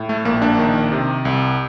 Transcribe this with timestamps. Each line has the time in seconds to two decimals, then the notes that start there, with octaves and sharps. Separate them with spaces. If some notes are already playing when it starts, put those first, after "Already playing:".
Already playing: A2
0.09 A3
0.25 A#1 A#3
0.42 A#3 D4
0.59 D#3
0.92 C3
1.25 C2